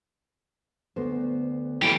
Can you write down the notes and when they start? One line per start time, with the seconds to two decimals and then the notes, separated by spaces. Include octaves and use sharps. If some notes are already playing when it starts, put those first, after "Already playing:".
0.96 D2 B3 C5
1.82 E3 E4 G4 A4